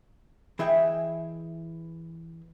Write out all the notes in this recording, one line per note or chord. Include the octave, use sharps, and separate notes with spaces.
E3 E4 G#4 D#5 G5